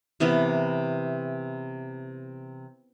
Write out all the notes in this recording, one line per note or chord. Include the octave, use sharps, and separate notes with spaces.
C3 E3 B3 A#4